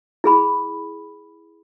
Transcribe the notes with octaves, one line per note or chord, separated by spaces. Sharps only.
E4 G#4 B5